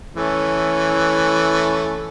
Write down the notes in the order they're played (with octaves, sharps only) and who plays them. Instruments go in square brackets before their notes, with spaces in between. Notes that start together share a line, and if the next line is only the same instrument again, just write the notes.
[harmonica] E3 A3 C#4